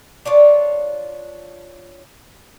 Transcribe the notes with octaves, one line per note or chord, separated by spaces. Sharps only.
D4 F4 C#5